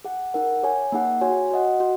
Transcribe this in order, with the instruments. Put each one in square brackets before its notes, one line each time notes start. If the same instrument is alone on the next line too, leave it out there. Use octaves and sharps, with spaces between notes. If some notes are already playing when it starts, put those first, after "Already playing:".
[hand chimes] G#4 F#5
D#4 A#4 F#5
G#4 C#5 G#5
A#3 D#4 G#4 F#5
F#4 C#5 G#5
F#4 D#5 F#5
F#4